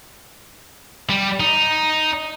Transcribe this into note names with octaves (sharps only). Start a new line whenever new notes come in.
G3
D#4